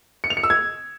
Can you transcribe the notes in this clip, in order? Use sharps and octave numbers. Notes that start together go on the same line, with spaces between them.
C#7
F7
C#7
E6
G#6